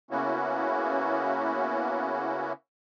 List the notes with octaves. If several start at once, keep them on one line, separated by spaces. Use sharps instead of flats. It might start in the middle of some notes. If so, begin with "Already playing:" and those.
C#3 A#3 B3 C#4 E4 F#4